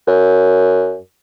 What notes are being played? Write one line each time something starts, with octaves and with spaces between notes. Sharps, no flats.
F#2